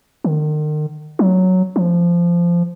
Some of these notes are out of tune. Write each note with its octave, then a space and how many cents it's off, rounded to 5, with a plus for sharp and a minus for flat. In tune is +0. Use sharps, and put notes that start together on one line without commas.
D#3 -40
F#3 +0
F3 -15